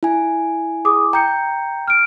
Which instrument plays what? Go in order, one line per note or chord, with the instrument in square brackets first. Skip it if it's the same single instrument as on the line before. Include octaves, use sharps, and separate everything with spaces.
[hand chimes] E4 G#5
[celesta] G#4 D6 D#6
[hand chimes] G5 G6 [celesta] A#5 C#7
[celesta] F6 D7